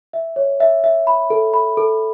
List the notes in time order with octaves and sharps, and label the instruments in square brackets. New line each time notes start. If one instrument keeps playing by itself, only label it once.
[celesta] E5
C#5
E5
E5
B5
A4
B5
A4